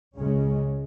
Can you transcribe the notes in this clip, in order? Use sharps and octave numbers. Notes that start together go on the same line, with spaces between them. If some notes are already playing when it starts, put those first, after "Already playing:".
C#2 C#3 G#3 C#4